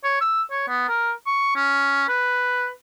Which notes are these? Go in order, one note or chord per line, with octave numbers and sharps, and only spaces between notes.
C#5
E6
C#5
B3
A#4
C#6
C#4
B4